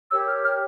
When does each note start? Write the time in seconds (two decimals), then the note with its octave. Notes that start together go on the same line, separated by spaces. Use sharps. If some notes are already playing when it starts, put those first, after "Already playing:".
0.11 G4 A#4 C#5 E6
0.27 F6
0.44 F6